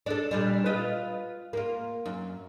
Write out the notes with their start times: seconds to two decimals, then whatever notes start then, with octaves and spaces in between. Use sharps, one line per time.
0.06 D4 A4
0.31 A#2 G3 D4
0.66 F4 B4 D#5
1.53 A#3 F4
2.06 F#2